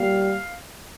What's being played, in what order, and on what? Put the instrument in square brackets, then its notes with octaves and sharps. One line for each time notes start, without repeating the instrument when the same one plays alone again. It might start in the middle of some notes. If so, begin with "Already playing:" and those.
Already playing: [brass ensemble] A#2 G3 A#3 F5